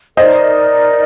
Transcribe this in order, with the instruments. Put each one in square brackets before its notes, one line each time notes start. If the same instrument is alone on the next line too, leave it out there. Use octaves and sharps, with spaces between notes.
[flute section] D#4 A#4 D5 [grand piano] C5 D#5